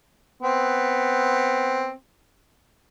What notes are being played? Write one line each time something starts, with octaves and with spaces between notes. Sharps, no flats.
B3 C4